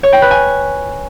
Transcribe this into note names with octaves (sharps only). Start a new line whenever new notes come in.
C#5
G5
B4
G#5